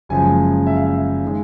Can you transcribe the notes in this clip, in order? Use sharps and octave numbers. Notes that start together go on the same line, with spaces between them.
F#1 F#2 C#3 F3 G#3 G#5
E5
F5
E5
D#3 G#3